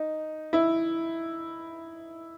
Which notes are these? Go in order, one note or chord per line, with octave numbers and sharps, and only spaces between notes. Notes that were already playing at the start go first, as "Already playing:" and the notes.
Already playing: D#4
E4